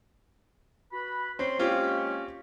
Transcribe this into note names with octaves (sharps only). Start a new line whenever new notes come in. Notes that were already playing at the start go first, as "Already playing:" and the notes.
F#4 B4 B5
C4 C#4 C6
G#3 A#3 C4 C#4 F4 G4